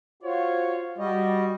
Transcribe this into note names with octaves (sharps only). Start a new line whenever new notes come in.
F4 F#4 C5 C#5
G3 F#4 D#5